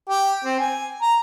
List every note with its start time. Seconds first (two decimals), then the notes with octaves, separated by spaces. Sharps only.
0.09 G4
0.44 C4
0.60 G#5
1.02 A#5